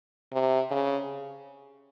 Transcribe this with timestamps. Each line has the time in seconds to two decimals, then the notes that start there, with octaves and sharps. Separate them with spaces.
0.33 C3
0.71 C#3